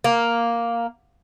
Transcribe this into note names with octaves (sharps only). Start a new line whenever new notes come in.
A#3